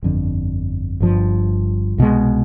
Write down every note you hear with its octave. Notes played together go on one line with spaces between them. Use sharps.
G1 F2 D3
G1 G2 F3
C2 B2 G#3